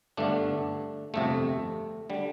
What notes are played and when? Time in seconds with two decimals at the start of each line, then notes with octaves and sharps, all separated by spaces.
0.17 G1 G2 D3 A3 D4
1.14 G1 F2 C3 A3
2.10 D3 G3